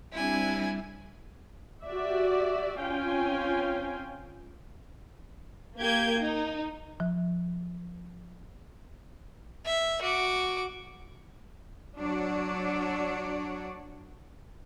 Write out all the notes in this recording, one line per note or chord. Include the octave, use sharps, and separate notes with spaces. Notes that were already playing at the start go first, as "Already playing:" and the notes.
G3 C4 D4 E4 G#5
F#4 G4 D5 E5
C4 C#4 F4 F5 G5 G#5
A#3 G4 G6 G#6 D7
D#4
F3
E5
F#4 D6
F#3 D4 F#4 C#5 D5